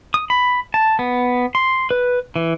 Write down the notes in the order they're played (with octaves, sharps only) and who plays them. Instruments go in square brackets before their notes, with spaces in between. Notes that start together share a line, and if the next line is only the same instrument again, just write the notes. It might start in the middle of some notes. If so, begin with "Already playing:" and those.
[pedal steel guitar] D#6
B5
A5
B3
C6
B4
E3